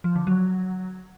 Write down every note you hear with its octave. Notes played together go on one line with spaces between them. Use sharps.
F3
D3
F#3